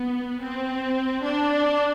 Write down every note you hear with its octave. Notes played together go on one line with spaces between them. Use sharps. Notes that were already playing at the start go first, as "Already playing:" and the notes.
Already playing: B3
C4
D4